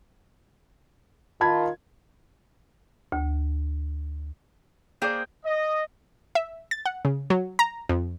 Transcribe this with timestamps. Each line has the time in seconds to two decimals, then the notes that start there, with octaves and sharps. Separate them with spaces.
1.41 D#3 F4 A5 B5 G#6
3.12 D2
5.02 A#3 G#4 C5 D5 G5
5.45 D#5
6.35 E5
6.71 A6
6.86 F#5
7.05 C#3
7.30 F#3
7.59 A#5
7.89 F2